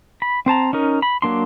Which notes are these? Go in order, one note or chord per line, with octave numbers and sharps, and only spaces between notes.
B5
C4 C5 A5 A#5
C#4 D#4 A#4
B5
F#3 A#3 D4 C6